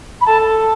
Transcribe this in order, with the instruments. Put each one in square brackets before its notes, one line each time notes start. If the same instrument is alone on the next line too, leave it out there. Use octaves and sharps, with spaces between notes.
[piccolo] B5
[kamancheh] A4 [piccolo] A5